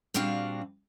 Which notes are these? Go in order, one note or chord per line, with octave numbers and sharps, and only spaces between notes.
A#2 G3 C4 D4 F#4 F5